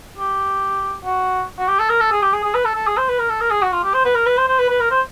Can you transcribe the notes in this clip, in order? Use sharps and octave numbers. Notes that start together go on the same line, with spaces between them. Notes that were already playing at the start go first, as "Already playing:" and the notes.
G4
F#4
F#4
G4
A4
A#4
A4
G#4
G4
G#4
G#4
B4
A4
A4
G#4
C5
B4
A#4
A4
A#4
G#4
F#4
F4
G4
C5
B4
A#4
B4
C5
C5
B4
B4
A#4
C5